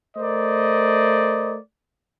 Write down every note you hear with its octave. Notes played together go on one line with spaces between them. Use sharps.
A3 A#4 C5 D5 D#5